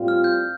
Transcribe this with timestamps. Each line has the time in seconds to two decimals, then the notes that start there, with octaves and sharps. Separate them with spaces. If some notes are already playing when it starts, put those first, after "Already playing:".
Already playing: A2 G3 C4 F4
0.08 F6
0.24 G6